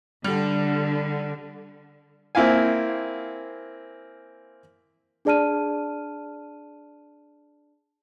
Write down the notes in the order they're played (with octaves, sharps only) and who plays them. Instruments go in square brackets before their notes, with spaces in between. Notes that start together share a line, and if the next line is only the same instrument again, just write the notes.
[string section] D3 [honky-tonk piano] G3
[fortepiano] A#3 C4 E4 F5 G#5
[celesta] D4 G#4 D5 A5 F6 D#7